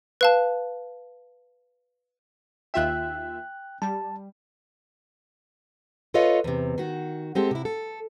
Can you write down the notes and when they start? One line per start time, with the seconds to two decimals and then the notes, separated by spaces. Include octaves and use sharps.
0.21 B4 F5 A5
2.74 D#2 F4 E5 G5 F#6
3.82 G3 A5
6.14 F4 A4 B4 C#5 D#5 F5
6.44 E2 C3
6.78 D#3 F#4
7.35 G#3 C4 G4 A4
7.51 C3 E4
7.65 A4